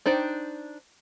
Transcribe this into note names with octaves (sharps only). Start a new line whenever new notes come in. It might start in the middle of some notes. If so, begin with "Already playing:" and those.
D4 D#4 C5 D5 G5